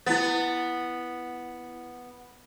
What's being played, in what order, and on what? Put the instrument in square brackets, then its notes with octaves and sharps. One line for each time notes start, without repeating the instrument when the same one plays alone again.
[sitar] B3 [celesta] E4 A6